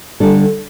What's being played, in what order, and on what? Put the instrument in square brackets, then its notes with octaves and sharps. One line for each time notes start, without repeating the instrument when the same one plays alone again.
[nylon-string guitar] D3 G3 D4 A4